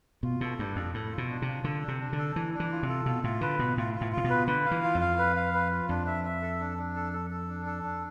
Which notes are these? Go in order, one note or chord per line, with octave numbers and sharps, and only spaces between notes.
B2 F4
B2 A4
G2 D4
F2 A4
A2 A4
F4
B2
D4
C3 F4
D3 A4
D4
C3
D4
D3
A4
E3 D4
D4
E3
F4
C3
A4
B2 F4
A2 F4
D3 B4
B2 F4
A2 F4
F4
A2
C3 F4
B2
B4
D3 B4
F5
E3
F4
F2
F5
B4
F5
B4
F4
F2 D4
E5
E5
A4
D4
D4
A4
A4
A4
D4
A4
D4